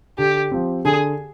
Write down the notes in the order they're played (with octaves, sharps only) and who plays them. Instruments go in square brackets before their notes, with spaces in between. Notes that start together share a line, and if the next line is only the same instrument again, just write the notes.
[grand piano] D3 [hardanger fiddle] G4
[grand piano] F3 C4
[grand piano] D3 [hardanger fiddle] G#4